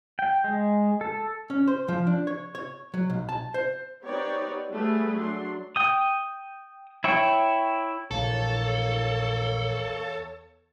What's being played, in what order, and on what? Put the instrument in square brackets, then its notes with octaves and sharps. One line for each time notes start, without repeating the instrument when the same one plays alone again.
[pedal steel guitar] G5
G#3
A4
[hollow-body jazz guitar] C#4
C5
F3
D4
C#5
C#5
F#3
B1
A5
C5
[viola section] B3 C4 D#4 G4 C#5 D5
G3 A3 B3 G#4
F#3 D4 C6
[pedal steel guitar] G5 D#6
E4 C#5 G5 C#6
[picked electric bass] A#1 [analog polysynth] E2 C#5 [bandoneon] A#3 [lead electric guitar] A4